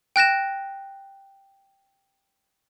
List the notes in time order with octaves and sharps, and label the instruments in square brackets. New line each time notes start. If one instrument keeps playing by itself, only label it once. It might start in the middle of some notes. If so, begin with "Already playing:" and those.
[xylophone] G5 F#6 A#6 E7